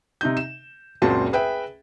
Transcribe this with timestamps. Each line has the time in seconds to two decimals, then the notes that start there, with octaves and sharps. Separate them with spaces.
0.21 C3 D#4 G6
0.37 E7
1.02 F#1 C#2 A#2 C4 F#4 A5
1.33 G#4 B4 E5 G5